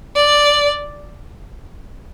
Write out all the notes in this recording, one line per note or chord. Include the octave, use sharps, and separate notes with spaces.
D5